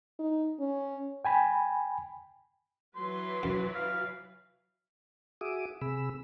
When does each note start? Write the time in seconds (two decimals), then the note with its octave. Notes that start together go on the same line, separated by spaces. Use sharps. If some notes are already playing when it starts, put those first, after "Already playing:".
0.19 D#4
0.60 C#4
1.25 G5 G#5 B5
2.95 E3 F#3 B4 C6
3.43 F#2
3.74 F5
5.41 F#4 G#4 E5 D6 D#6
5.81 C3 G#4 B5 E6